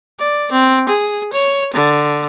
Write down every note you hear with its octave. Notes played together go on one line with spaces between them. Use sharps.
D5
C4
G#4
C#5
D3